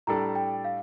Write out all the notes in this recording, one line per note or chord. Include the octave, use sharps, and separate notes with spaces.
A2 G3 D4 A4 A#5
G5
F5